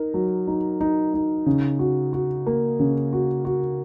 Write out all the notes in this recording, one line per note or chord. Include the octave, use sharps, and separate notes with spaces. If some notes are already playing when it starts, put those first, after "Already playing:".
Already playing: D#4 A#4
F#3
D#4
D#4
D#4
C#3
F#4
F#4
A#3
C#3
F#4
F#4